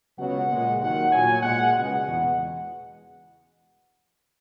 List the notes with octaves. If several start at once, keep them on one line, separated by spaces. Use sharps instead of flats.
C#2 B2 F#3 F#5
A#2 G#3
D#2 D#3 F#3 F#5
A#2 F#3 G#5
A#2 G#3 F#5
C#2 B2 G#3 F#5
E2 B2 G#3